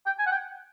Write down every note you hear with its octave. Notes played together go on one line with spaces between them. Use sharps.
G5
G#5
F#5
G5